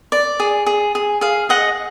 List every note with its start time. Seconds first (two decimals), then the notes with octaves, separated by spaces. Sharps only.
0.12 D5
0.40 G#4
0.66 G#4
0.95 G#4
1.21 G#4 F5
1.49 G#4 D#5 F#5